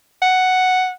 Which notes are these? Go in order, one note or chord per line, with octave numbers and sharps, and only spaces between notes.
F#5